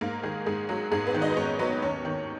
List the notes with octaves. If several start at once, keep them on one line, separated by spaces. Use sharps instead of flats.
G#2 A#3 A#4
D#3 G#3 G#4
G#2 G#3 G#4
F#3 G#3 G#4
G#2 G#3 G#4
B3 B4
D#3
D#4 D#5
B4
G#2 C#4 C#5
F#3 B3 B4
D#2 C#4 C#5
D#3